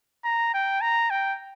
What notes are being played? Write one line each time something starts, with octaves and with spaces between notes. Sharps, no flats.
A#5
G5
A#5
G5